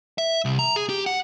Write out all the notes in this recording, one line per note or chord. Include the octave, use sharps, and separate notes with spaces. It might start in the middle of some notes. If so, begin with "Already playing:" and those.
E5
C2
A#5
G#4
G4
F#5